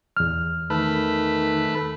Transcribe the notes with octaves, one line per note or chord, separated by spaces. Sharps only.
E2 F6
D#3 A3 B4